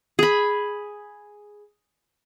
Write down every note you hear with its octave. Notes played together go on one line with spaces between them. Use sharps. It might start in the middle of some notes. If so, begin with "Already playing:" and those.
G#4 B5